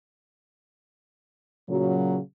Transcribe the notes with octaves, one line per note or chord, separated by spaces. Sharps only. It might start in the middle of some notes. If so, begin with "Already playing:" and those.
A#2 C#3 F#3